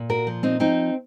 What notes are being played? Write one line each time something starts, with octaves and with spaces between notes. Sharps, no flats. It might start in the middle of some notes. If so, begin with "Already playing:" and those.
Already playing: A#2
F#4 A#4
F3
C4 D#4
F3 C4 D#4